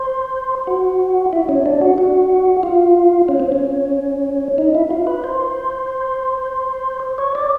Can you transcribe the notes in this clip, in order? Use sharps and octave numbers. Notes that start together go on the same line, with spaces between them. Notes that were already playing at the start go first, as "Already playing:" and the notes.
Already playing: C5
F#4
E4
C#4
D4
F#4
F#4
F4
C#4
C4
C#4
D#4
E4
F4
B4
C5
C#5
D5